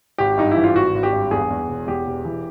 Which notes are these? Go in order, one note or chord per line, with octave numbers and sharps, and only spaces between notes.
G#1 G4
G2 D#4
E3 E4
F4
G#1 F#4
G#1
G4
G2
E2 G#4
E2
E1
E2 G4
E1
E3